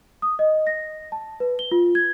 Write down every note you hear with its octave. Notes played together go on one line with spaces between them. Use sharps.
D#6
D#5
A#6
A5
B4
G7
F4
G#6